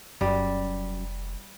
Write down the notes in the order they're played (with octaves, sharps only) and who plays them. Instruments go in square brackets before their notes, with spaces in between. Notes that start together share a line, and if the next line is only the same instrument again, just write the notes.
[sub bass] F1 [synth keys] F#2 [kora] G3